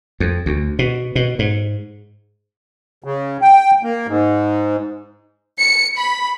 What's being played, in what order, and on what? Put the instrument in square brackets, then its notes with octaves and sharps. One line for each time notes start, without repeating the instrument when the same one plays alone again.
[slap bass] F2
D2
B2
B2
G#2
[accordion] C#3
G5
A#3
G#2
[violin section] C#7
B5